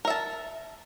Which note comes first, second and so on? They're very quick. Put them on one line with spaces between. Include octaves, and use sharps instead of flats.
A#4 E5 A5